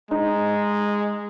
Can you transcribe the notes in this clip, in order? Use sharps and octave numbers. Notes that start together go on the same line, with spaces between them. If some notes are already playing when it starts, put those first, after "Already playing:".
G#3 D#4